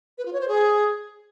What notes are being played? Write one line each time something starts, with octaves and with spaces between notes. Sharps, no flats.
B4
F4
C#5
C5
G#4